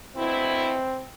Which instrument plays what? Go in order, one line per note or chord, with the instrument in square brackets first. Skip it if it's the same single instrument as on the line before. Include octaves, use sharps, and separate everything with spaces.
[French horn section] D2 B2 E4 [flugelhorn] C4